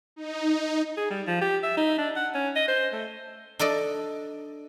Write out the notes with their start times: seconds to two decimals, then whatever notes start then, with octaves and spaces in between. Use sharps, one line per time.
0.16 D#4
0.97 G#4
1.10 G3
1.27 F3
1.41 G4
1.63 E5
1.77 D#4
1.98 D4
2.16 F#5
2.35 C#4
2.56 D#5
2.68 C5
2.93 A3
3.59 D4 A4 D5 D#5